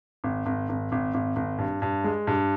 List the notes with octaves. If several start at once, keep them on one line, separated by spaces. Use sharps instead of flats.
G#1
G#1
G#1
G#1
G#1
G#1
G2
G2
G#3
G2